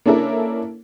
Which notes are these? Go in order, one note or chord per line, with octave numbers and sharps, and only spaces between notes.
A#3 C#4 D4 E4 A4 A#4